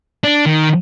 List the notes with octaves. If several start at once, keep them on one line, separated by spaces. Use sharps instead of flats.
D4
D#3